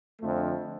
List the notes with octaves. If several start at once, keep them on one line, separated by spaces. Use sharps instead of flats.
F2 D3 F3 A3